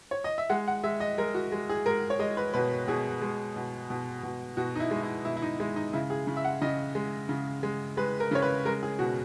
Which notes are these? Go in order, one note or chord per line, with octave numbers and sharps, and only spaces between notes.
C#5
D#5
E5
G#3 F#5
F#5
G#3 E5
D#5
G#3 A#4
F#4
G#3
G#4
G#3 A#4
C#5
G#3 D#5
B4
B2 B4
B2 G#4
G#3
B2
B2
B2
B2 F#4
D#4
E4
G#3
E4
B2 E4
E4
D#4
G#3 E4
D#4
C#3 E4
G#4
C#3
E5
F#5
C#3 D#5
G#3
C#3
G#3
G#3 B4
A#4
C#3 C#5
B4
G#3 A#4
G#4
B2 F#4